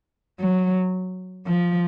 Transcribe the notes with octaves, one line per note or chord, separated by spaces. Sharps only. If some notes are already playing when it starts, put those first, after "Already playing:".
F#3
F3